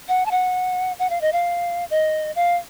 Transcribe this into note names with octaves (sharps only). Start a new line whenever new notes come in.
F#5
A5
F#5
F#5
F5
D#5
F5
D#5
F5